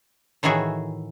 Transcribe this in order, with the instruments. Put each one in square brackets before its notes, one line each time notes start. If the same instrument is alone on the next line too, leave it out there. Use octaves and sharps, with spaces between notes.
[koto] A2 D#3 E3 F#4 G#4 E5